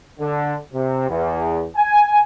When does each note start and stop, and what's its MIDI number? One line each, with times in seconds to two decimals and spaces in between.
0.20 0.55 50
0.73 1.09 48
1.09 1.64 40
1.76 2.21 80